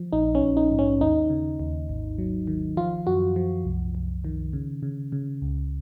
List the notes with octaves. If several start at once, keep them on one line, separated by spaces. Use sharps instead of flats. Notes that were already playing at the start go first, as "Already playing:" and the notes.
Already playing: F3
A#1 D#4
C#4
A#1
D#4
G#2
C#4
D#2 D#4
C#3
D#2
G#1
F#3
D#3
F3 F4
F#2 F#4
F3
C2
C2
D#3
C#3
C#3
C#3
C#2